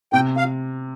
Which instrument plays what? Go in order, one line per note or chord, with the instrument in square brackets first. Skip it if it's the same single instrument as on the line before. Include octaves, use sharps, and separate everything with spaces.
[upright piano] C3 [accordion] G5
[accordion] F5